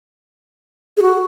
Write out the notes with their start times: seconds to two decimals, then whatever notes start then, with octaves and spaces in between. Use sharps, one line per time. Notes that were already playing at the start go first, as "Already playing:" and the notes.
0.97 G#4
1.02 F#4